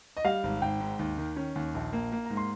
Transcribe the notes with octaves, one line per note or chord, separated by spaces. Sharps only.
D#5
G3 F5
G#1
G#1 G5
G#2
D#2
D#3
C#4
D#2
A#1
A#3
A#3
G#2 A#5
C6